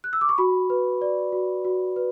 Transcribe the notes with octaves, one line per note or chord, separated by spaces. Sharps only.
F#6
E6
D6
C#6
F#4 B5
B4
D5
F#4
F#4
B4